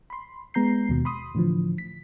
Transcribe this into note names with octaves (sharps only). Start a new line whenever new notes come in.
B5 C6
G#3 B3 A#5 G6 C7
D#2 B2
B5 C6 D#6
A2 D3 E3 F3
B6